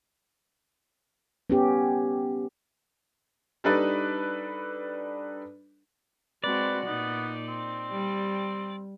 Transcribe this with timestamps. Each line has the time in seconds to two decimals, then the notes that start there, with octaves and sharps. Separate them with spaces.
1.50 B3 C#4 G4
3.64 G3 D4 D#4 A4 B4 D5
6.44 G#3 C4 F#4 B4 D5
6.86 A#2 B3 D#4
7.48 C4
7.92 G3